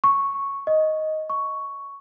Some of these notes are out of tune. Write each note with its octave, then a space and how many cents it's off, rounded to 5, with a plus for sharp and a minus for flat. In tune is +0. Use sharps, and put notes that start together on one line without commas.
C#6 -5
D#5 +5
C#6 +5